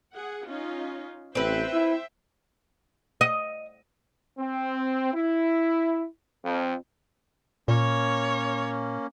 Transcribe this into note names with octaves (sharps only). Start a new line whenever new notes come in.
G#4 F#5
C#4 D#4 F4
A1 C4 B4 C5 E5 G5
E4
D#5
C4
E4
F2
A#2 A#3 C#4 C#5